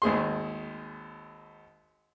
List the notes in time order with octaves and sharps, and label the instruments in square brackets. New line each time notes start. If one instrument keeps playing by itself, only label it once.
[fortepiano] G#1 D#2 G#4 C6